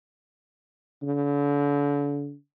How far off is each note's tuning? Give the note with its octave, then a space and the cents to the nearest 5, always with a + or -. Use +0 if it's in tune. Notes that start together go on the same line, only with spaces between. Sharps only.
D3 -40